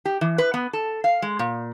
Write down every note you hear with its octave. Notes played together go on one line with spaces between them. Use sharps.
G4
E3
B4
B3
A4
F5
G#3
A#2